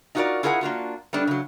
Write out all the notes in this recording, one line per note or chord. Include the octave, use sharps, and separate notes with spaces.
D#4 F4 F#4 G#4 A#4 D5
E4 F4 G#4 A#4 E5 F#5
A#3 D4 F4 F#4
G3 A3 B3 D4
C#3 F#3